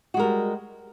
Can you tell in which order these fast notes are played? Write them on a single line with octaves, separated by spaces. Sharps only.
F#4 G#3 A#4 G3